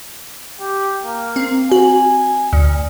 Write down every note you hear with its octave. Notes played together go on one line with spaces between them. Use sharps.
G4
A#3
C4
F#4 G#5
D2